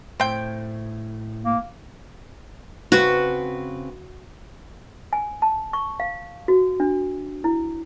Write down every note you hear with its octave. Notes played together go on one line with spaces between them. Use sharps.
A2 C4 G5
A#3
C#3 C4 F#4 B4
G#5
A5
C#6
F5
F#4
D4
E4